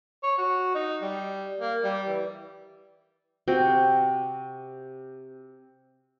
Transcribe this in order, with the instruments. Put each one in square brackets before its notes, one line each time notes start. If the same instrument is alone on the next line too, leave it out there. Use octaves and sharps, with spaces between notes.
[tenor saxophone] C#5
F#4
D#4
G3
A#3
G3
E3
[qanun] C3 C4 F#4 G5